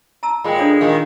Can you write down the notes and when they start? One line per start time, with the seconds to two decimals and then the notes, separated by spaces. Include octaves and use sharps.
0.23 A5 A#5 E6
0.44 A#2 G#3 G5 B5
0.59 D4 A4 C#5
0.81 A#2 D#3 G#3 F5